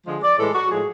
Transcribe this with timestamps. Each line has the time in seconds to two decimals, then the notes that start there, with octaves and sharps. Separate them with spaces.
0.06 D3 F3 G#3
0.23 D5
0.38 A2 E3 G#3 A4
0.54 F#4
0.70 A2 F3 G#3 G#4